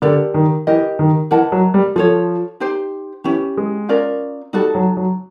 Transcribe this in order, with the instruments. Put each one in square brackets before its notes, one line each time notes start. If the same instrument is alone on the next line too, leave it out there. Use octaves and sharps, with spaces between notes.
[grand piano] D3 [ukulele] G4 A#4 D5
[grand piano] D#3
[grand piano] E3 [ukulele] G4 A#4 D#5
[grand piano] D#3
[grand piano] E3 [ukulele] A#4 D#5 F#5 A5
[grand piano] F#3
G3
[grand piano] F3 [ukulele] F4 A4 C#5
[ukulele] D#4 G4 C5
[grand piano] E3 [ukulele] C#4 E4 G4
[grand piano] G#3
[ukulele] C#4 F4 A#4 D5
[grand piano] G3 [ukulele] D#4 F#4 A4
[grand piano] F#3
F#3